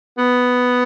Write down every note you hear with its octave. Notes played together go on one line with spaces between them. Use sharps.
B3